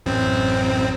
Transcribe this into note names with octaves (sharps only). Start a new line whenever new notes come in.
A1 F#2 C4